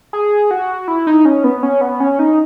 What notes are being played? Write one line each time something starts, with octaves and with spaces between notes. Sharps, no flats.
G#4
F#4
E4
D#4
C#4
B3
C#4
B3
C#4
D#4